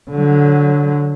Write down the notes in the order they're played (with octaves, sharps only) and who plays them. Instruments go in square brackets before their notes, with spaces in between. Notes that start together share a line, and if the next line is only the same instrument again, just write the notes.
[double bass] D3 F#3